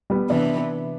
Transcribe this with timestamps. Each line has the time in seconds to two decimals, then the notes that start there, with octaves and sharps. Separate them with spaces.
0.10 G3 B3
0.30 C3 E3 B3 D4